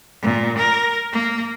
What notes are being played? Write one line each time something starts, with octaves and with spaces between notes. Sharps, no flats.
A#2
A#4
A#3